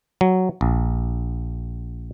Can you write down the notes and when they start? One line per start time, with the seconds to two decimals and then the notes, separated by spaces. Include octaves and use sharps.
0.21 F#3
0.61 A#1